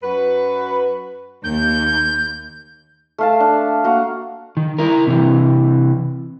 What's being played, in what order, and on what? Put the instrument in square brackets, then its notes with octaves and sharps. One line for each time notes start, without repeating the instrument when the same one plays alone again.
[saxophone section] F#2 F#4 B4
[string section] D#2 [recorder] G6
[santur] A3 F5 A5
D4
A#3 F#4 F5 A#5
[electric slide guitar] D#3
E4 A#4
C3 E3